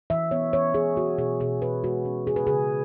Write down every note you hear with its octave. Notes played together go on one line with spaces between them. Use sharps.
E3 E5
B3 C#5
E3 C#5
E3 G#4
B3 F#4
B2 G#4
B2 G#4
B2 B4
G#3 F#4
C#4
C#3 G#4
B4
C#3 G#4